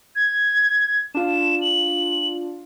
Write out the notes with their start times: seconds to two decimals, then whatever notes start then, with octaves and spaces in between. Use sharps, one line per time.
0.16 G#6
1.15 D4 F4 E7
1.62 F#7